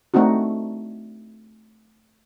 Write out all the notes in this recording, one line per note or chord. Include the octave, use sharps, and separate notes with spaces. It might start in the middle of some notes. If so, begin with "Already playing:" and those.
A3 C4 D4 D#4 F#4